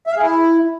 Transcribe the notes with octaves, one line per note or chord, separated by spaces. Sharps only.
E5
F5
G#4
E4